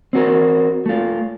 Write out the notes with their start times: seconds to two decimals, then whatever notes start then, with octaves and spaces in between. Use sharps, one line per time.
0.13 C4 F#4 A#4
0.86 A3 F4